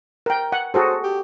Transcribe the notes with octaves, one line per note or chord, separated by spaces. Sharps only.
A#4 G5
F#5
F#4 G#4 A4 C5
G4